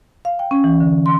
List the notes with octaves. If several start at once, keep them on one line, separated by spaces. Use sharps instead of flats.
F5
G5
C#4
E3
D3
C6